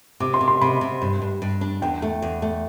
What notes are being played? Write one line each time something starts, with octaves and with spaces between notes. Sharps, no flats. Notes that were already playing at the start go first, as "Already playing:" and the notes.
C3 D6
C6
C3
C6
C3 B5
C3
G2
G2
G2
D4
E2 G5
A3
E2
A3